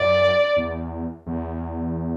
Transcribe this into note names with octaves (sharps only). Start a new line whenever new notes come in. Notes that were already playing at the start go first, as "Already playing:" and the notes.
Already playing: F#2 D5
E2
E2